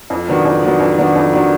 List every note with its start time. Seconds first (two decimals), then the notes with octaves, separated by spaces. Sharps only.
0.10 F2
0.28 D#3 F#3 B3 D4
0.45 F2
0.63 D#3 F#3 B3 D4
0.80 F2
0.98 D#3 F#3 B3 D4
1.16 F2
1.33 D#3 F#3 B3 D4